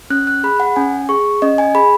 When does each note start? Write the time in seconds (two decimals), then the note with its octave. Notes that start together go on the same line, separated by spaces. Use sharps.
0.10 C#4 F#6
0.27 F#6
0.44 G#4 B5
0.60 F#5
0.76 C#4 G#5
1.09 G#4 C#6
1.42 C#4 D#5
1.58 G#5
1.75 G#4 B5